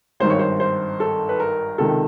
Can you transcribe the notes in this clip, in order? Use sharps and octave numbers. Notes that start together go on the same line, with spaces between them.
G#1 G2 D#3 C5
C#5
C5
C5
A4
B4
A#4
C#2 C3 D#3 A4